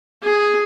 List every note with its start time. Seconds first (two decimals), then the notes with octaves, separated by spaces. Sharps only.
0.23 G#4